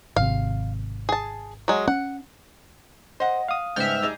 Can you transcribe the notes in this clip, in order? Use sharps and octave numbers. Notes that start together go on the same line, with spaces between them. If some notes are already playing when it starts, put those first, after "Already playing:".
G#1 C3 F5
G#4 A5
F#3 G#3
C#4 F#5
C5 D#5 F#5
F5 D#6
G#2 C#3 G3 B3 E5 F6 G6
G3 D#4 G#4